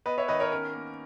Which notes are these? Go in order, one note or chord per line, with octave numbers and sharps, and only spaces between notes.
B3 B4 D#5
C#5 E5
D#3 B4 D#5
A#4 C#5
C#4 A#4
A#3